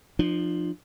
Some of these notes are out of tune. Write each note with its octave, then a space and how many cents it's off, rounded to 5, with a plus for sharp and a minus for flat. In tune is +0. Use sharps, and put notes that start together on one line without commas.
F3 +0 D4 +45